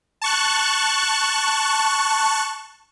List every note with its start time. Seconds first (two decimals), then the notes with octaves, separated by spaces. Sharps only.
0.22 A5 C#6 F#6